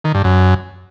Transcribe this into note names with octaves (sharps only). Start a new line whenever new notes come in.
D#3
G2
F#2